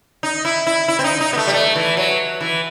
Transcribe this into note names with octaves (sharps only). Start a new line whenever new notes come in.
D#4
E4
E4
E4
C4
D#4
D#4
B3
A3
G3
A3
E3
F#3
E3